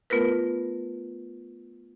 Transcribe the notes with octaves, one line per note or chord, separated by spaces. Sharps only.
A3 B3 F4 A#4 B4